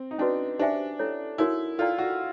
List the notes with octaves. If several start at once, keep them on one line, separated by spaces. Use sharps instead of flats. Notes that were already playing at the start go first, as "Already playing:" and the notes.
Already playing: C4
D#4
C#4 D4 F#4 B4
D4 G4 C5 E5 G#5
C#4 E4 A4 C#5
D#4 E4 F#4 A#4 C#5 F#5
F4 A4 D5 G5 A#5
F#4